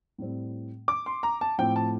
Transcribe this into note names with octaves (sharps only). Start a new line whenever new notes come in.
A2 G3 C4
D6
C6
A#5
A5
A2 F3 A3 C4 G5
A5